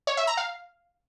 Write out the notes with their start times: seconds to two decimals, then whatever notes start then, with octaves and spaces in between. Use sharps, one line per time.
0.07 C#5
0.17 E5
0.27 A#5
0.37 F5